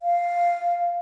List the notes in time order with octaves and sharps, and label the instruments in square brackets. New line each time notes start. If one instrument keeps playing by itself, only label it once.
[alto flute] F5